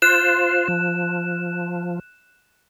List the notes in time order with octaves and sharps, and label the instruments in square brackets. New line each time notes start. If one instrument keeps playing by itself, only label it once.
[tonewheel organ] F4 C5 [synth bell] F#6 E7
[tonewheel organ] F3